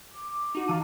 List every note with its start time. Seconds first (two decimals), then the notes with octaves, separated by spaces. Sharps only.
0.11 D6
0.55 D#4 F#4
0.68 E3 F5 A5 A#5 D#7